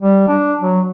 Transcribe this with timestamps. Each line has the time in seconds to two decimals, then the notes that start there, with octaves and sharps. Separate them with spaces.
0.02 G3
0.28 D4
0.61 F#3